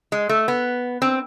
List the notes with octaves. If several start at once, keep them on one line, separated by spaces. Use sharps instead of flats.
G#3
A3
B3
C4